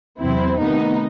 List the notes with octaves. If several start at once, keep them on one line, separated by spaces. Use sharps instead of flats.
E2 C3 F#3 C4 E4
C3 D#3 A3 B3 D#4